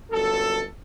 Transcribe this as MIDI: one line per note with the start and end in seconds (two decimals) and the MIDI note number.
0.11 0.62 31
0.11 0.62 42
0.11 0.62 69